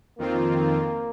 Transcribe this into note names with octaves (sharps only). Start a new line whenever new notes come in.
F2 D#3 A#3 C4 F4